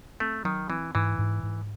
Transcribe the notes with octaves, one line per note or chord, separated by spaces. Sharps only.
A3 C4
D#3 F#3
E3 C4
G#2 E3
G#2
G#2